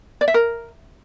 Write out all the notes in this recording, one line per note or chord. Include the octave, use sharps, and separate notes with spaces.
D5
E5
A#4